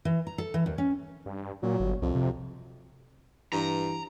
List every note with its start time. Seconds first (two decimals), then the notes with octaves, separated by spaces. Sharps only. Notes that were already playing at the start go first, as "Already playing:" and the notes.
0.05 E3
0.27 A#5
0.38 A4
0.54 E3
0.66 D#2
0.78 C#4
1.26 G2
1.63 A#2 F#3
1.80 G1
2.02 C2 F2
2.15 C3
3.53 G2 E3 A#5